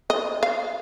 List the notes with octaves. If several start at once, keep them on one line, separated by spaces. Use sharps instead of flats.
D#5
F5